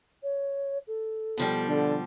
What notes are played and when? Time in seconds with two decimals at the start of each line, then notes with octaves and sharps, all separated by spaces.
0.23 C#5
0.87 A4
1.38 B2 F3 G3
1.68 D3